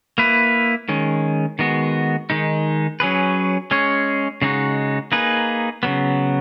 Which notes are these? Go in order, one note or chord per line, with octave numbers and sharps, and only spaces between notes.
A#3 E4 B4
D#3 G#3 C#4
D#3 G#3 B3 F#4
D#3 G#3 D#4
F#3 C#4 G#4 B4
G#3 C#4 G#4 C#5
C#3 G#3 D#4 F#4
A#3 D#4 G#4 B4
C#3 F#3 B3